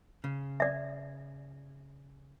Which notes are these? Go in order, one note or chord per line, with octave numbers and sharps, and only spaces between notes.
C#3
D5 E5